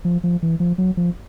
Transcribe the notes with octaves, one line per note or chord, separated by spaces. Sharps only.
F3
F3
E3
F3
F#3
F3